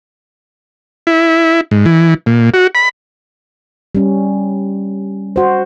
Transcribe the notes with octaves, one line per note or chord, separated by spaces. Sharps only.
E4
G#2
E3
A#2
F#4
B5
G3 C#4
F#4 C5